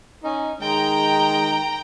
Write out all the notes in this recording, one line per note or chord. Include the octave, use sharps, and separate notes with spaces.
C#4 D#4
D#3 G#3 G5 A#5